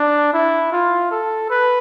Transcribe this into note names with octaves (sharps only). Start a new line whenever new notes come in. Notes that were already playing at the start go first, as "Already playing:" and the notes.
Already playing: D4
E4
F4
A4
B4